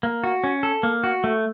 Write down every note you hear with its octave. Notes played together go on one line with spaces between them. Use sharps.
A#3
F#4
C#4
A4
A#3
F#4
A3